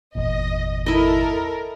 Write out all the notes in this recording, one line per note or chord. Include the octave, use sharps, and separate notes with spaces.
G1 E2 A#2 D#5
E4 A4 A#4 D#5